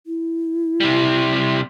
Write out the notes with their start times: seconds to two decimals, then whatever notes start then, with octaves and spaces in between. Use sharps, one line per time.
0.07 E4
0.80 C3 G3